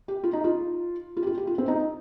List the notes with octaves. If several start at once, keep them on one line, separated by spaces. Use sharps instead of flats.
G4
F4
D#4
F4
F4
G4
F4
G4
F4
C4
D#4